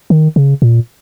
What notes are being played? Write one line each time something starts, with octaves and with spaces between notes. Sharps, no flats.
D#3
C#3
A#2